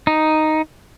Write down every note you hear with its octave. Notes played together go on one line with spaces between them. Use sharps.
D#4